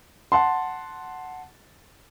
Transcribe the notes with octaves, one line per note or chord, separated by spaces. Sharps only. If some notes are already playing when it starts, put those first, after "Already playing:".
F#5 A5 C6